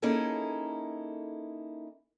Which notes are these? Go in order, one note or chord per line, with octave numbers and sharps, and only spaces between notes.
A#3 C#4 D#4 E4 G#4 A4